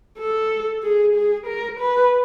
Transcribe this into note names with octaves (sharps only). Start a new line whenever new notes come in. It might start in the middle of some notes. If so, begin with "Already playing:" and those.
A4
G#4
G#4
A#4
B4